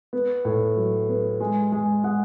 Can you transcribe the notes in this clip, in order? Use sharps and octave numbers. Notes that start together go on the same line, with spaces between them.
B3
A2
F#3
B3
G#3
G#3
G#3 D#5 F#5